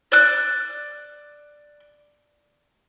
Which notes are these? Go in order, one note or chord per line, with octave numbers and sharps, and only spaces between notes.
D5 F#6